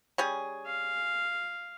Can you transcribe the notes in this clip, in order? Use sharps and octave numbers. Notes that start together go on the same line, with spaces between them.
G3 C#4 G#4
F5